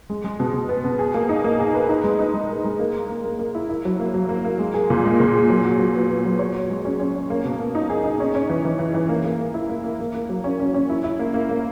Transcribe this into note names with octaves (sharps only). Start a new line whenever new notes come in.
G#3
G#3
B2
B2
B3
B2
G#4
A#3
D#4
A#3
G#4
B4
D#4
G#3
D#4
G#3
A#4
G#3
A#3
A#4
A#3
A#3
A#3
E4
E4
F#3
A#3
F#3
A#3
A#3
G#3
G#4
A#2
G#3
A#2
G#4
F#3
F#4
F#3
B3
B3
F#3
C#5
F#4
G#3
C#4
C#4
C#4
A#3
B2
A#3
D#4
G#4
D#4
C#4
C#4
E3
E3
E3
E3
A#3
A#3
A#3
E4
A#3
A#3
A#3
A#3
F#3
C#4
C#4
C#4
E4
E4
A#3
A#3
A#3